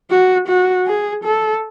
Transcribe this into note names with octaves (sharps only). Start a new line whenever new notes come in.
F#4
F#4
G#4
A4